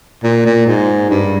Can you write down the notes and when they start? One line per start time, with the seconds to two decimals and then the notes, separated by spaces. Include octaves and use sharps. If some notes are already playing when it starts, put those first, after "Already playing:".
0.24 A#2
0.46 A#2
0.67 G#2
1.10 G2